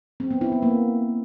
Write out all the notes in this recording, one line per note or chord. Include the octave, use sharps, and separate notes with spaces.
C4
B3
E4
B3
A#3